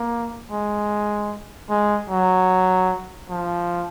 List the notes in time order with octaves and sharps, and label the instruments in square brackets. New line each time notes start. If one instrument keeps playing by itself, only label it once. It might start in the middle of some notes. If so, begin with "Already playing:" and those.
Already playing: [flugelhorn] A#3
G#3
G#3
F#3
F3